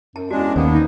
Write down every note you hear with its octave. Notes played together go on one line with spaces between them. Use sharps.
F#2 A5
E2 G#3 C#4 D4 F#4
D#2 A#3 B3 C5 G5 A5
D#4